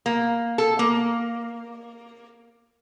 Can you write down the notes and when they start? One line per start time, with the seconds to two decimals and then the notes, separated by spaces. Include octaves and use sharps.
0.06 A#3
0.58 A4
0.79 A#3